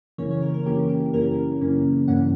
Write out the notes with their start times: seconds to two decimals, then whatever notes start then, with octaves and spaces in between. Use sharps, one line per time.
0.18 F#2 C#3 E3 A#3 C#4 C#5
0.31 C#5
0.42 A#4
0.54 A#4
0.66 F#2 C#3 E3 A#3 C#4 G4
0.89 G4
1.14 F#2 C#3 E3 A#3 C#4 A#4
1.61 F#2 C#3 E3 A#3 C#4
2.08 G2 E3 A#3 C#4 F#5